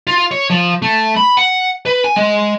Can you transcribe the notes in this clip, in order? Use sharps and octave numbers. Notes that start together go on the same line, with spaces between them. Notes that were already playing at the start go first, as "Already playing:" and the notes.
F4
C#5
F3
A3
B5
F#5
B4
G#5
G#3